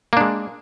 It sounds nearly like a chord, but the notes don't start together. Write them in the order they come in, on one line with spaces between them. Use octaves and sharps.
A#3 D4 G#3